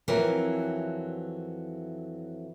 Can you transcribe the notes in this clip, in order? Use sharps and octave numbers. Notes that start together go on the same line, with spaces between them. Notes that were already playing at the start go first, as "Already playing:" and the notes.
F2 E3 F#3 C4 A#4